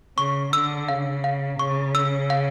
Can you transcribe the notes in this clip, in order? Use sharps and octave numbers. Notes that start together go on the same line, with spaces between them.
C#3 C#6
D3 E6
C#3 F5
F5
C#3 C#6
E6
F5